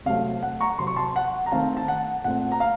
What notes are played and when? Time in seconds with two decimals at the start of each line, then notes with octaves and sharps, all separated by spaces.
0.06 C3 F#3 A3 C4 F5
0.43 F#5
0.61 A#5 C#6
0.79 C3 F#3 C4 C6
0.87 C#6
0.96 A5 C6
1.16 F#5
1.46 A#5
1.52 D#3 A3 C4 F5 A5
1.77 A5
1.88 F#5
2.24 A#2 A3 C4 F#5
2.52 A#5
2.60 F5